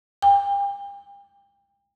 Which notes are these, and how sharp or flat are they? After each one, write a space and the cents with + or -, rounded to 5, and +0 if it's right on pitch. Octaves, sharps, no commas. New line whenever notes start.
G5 +40